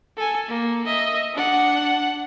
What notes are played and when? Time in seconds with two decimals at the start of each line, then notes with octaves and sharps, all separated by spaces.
0.17 A4 G#5
0.48 A#3
0.86 D#5 E5
1.34 D4 F#5